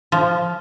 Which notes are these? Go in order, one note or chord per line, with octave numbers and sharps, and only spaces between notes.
F3